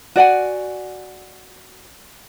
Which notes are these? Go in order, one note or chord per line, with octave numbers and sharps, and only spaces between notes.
F#4 D5 F#5 G#5